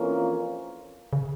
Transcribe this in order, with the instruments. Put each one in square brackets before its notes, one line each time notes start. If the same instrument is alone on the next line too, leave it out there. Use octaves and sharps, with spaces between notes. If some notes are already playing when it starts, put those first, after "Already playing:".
Already playing: [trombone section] F2 E3 A#3 C#4 F4
[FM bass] C#3